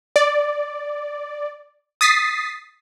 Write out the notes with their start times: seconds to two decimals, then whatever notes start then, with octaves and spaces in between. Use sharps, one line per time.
0.16 D5
2.01 D#6 A6 B6 C7